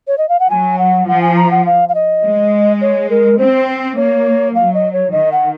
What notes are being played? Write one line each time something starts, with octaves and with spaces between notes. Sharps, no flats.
C#5
D#5
F5
F#5
F#3 G#5
F#5
F3 F#5
G#5
A#5
F#5
F5
F5
D#5
G#3
C#5
A#4
C4 C5
A#3 C#5
F#3 F5
D#5
C#5
D#3 D#5
F#5